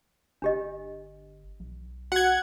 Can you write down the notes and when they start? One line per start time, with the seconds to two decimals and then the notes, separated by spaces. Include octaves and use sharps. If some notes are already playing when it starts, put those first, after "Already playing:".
0.42 G1 D4 G4 D#5
1.60 B1
2.12 F#4 F#5 G#6